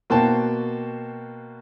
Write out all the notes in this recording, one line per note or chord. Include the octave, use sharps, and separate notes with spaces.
B2 A#3 F#4 C5 G5 A5